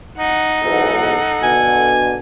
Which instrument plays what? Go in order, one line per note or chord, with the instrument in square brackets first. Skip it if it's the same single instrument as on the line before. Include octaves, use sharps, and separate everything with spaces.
[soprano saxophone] D#4 [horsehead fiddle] F#5
[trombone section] B1 E2 G#2 [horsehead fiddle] A4 F#5
[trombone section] B2 D3 [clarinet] G#5